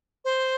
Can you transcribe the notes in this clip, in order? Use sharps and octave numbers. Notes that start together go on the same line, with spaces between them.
C5